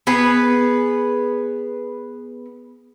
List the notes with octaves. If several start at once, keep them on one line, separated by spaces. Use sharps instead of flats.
B3 G#4 B4